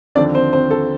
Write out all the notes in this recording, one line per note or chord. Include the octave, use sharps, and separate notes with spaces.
D#2 D3 F3 C4 D4 D5
C4 C5
C4 C5
A4